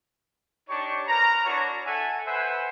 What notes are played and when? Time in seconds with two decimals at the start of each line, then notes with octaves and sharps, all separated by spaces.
0.69 D4 D#4 G4 C#5 C#6
1.08 A#4 B4 A#5
1.45 D4 E4 F#4 C#5
1.86 A4 E5 F#5 G#5
2.27 B4 C5 E5 F#5 G#5